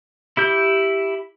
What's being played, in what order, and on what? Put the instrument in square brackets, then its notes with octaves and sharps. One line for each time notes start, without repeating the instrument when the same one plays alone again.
[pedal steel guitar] E4 G4 G6